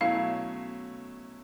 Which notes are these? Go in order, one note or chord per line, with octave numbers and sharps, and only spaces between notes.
B2 F#3 A3 C#4 E4 F5